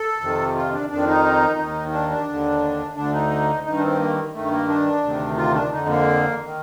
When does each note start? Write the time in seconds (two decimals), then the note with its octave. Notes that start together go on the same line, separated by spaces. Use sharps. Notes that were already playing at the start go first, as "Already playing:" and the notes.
Already playing: A4
0.21 F2 C3 D#3
0.55 F4
0.73 D4
0.90 F2 D#3 D4
1.07 D#4
1.59 D#2 D#3
1.92 D4
2.10 D4
2.28 D#2 D3
2.96 D2 D3 D4
3.13 D#4
3.65 G2 D#3 D#4
3.78 D4
3.82 C4
3.99 A#3
4.34 G2 D#3 A3
4.51 A#3
4.68 D4
5.03 D2 C3 D#3
5.37 F4
5.55 D4
5.71 F2 D3 D#4
5.89 A#3
6.44 D#3